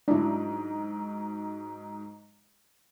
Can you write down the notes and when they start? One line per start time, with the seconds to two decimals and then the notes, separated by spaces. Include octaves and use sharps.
0.08 G#2 F#3 D4 E4